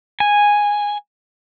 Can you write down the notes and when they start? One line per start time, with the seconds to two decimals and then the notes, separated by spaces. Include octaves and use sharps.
0.20 G#5